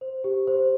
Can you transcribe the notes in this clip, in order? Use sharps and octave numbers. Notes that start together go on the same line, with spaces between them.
C5
G4
C5